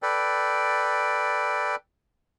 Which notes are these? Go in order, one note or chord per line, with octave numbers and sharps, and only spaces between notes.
A4 B4 D5 G5